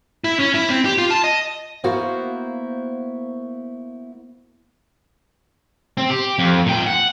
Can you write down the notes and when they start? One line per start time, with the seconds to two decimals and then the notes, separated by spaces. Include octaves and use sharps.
0.24 E4
0.39 C#4
0.54 E4
0.70 C4
0.85 G4
0.98 F4
1.10 A5
1.24 D#5
1.84 A#3 B3 E4 F#4 C5 F5
5.97 C4
6.10 G4
6.39 F2
6.66 A#2 G5
6.86 F#5